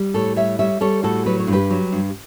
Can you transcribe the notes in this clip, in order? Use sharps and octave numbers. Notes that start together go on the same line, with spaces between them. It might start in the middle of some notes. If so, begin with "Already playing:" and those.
Already playing: G3
A2 A4 C#5
G3 C#5 E5
G3 C#5 E5
G3 A4 C#5
A2 F#4 A4
F#3 B4
C#5
G2
G4 B4
F#3
G2